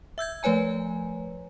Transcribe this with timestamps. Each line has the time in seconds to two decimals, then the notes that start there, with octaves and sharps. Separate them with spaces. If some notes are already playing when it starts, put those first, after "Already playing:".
0.18 E5 E6 G6 G#6
0.43 F3 A3 B4 C#5 G#5 A#5